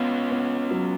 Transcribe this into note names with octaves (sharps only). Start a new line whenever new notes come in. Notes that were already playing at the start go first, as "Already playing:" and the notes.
Already playing: B3 C#4 F4
B3
F#3